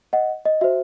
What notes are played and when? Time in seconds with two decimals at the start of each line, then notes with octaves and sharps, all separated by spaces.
0.13 D#5 F#5
0.45 D#5
0.61 F#4 C5 E5